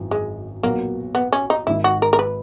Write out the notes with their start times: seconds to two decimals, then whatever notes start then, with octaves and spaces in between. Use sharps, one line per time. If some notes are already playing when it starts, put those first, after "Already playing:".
Already playing: G#1 F#2 E3
0.11 G#3
0.63 B1 A#2 F#3 A#3 B3 F#4
1.15 B3
1.32 C#4
1.50 D#4
1.67 G#1 G#2 D#3 E4
1.84 F#4
2.02 A#4
2.13 A#4
2.19 B4